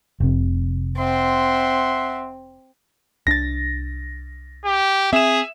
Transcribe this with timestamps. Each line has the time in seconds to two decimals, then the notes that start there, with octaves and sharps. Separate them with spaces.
0.20 F1 C3
0.98 C4 E5 F#5 C6
3.27 C2 D4 A6 A#6
4.65 G4
5.13 C4 G#4 E5 E7